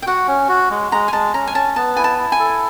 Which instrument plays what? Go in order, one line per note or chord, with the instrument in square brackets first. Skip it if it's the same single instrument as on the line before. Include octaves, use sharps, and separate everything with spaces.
[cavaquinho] G5
[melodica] F#4 [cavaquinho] F#5
[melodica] C#4
F#4
G#3
[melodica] G#3 [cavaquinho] A#5
[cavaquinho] G#5
[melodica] G#3 [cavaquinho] A5
[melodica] C#4 [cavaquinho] A#5
[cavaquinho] G#5
[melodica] C#4 [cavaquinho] A5
[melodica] B3 [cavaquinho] A5
[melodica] E4 [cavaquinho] G#5
[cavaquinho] A5
[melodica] E4
[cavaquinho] G#5
[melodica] A4